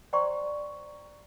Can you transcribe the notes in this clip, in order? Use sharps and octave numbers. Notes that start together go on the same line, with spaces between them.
C5 D5 G5 A#5 C6 C#6